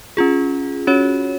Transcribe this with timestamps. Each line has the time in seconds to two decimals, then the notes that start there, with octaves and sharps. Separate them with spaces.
0.17 C#4 F4 G#4
0.87 C#4 F#4 C#5